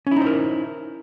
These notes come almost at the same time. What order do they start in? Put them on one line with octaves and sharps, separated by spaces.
C#4 E4 D#4 C5 A#4